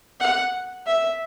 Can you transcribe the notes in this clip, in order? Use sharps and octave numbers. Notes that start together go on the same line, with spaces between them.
F#5
E5